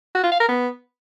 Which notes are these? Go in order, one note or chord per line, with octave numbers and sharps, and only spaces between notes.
F#4
F4
F5
A#4
B3